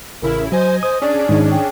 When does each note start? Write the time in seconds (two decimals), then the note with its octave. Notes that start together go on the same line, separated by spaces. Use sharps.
0.22 A1 C#3 E4 A#4
0.52 F#3 C5 D#5 G#5
0.83 C5 D#6
1.02 C#4 D4 G#4 D5
1.29 G#2 D#3 D#4
1.51 G5